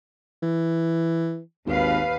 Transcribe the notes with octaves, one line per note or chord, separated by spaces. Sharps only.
E3
G#1 D#2 B4 F5